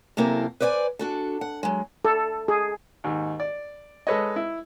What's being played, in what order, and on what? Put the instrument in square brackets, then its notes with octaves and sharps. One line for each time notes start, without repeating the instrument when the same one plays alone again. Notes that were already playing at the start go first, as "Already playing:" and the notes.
[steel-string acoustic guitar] F#2 C3 A#3 E4 A4 A#4
B4 C5 D5 D#5 G#5
D4 F#4 A4
F#5
F#3 G#3
[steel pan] A4
G#4
[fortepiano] D#2 G#2
D5
G#3 A4 B4 C#5 D#5
E4